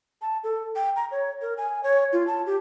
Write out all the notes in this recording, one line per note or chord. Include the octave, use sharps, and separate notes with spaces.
A5
A4
G5
A#5
C#5
A#4
G#5
C#5
F4
A5
G4